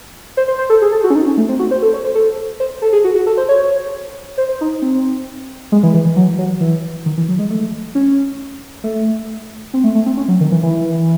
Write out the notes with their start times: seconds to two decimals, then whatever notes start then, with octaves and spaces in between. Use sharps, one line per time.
0.37 C5
0.48 C5
0.58 C5
0.70 A4
0.82 G#4
0.92 A4
1.04 F#4
1.10 C#4
1.15 D#4
1.26 C#4
1.37 A3
1.49 C4
1.59 F#4
1.71 C5
1.82 A4
1.93 C#5
2.04 C5
2.15 A4
2.60 C5
2.82 A4
2.93 G#4
3.04 F#4
3.15 F#4
3.26 A4
3.37 C5
3.49 C#5
4.38 C5
4.49 C5
4.61 D#4
4.82 C4
5.72 G#3
5.83 E3
5.94 E3
6.05 E3
6.16 F#3
6.38 F#3
6.60 E3
7.06 D#3
7.17 E3
7.28 F#3
7.39 G#3
7.50 A3
7.95 C#4
8.84 A3
9.74 C4
9.84 A3
9.95 A3
10.06 C4
10.17 C#4
10.28 F#3
10.41 D#3
10.52 E3
10.63 E3